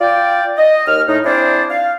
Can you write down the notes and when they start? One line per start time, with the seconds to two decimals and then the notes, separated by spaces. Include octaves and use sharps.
0.01 F4 D5 G5
0.58 D#5
0.87 D#2 F6
1.08 A2 D#4
1.25 C4 D4 E4 G#4 C5 D5
1.70 F5